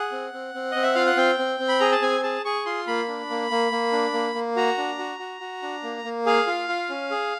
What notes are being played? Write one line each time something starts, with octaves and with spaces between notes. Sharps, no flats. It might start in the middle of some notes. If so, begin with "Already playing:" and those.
Already playing: G#4 F#5
C4
C4
C4
C4 D#5
E5
F4 F5
F#5
C4 G5
C4
C4
B5
G#4 A#5
A5
C4 G#5
G#4 A5
G#4 C#6
F4 C6
A#3 B5
D4
A#3
A#3
A#3
D4
A#3
A#3
F#4 A#5
D4
F#4
F#4
F#4
D4
A#3
A#3
G#4 F5
F4
F4
C#4
G#4